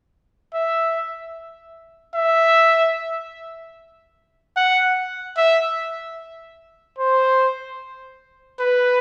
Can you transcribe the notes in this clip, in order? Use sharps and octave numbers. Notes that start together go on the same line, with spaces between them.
E5
E5
F#5
E5
C5
B4